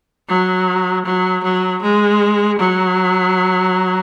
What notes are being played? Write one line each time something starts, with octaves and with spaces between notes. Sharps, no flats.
F#3
F#3
F#3
G#3
F#3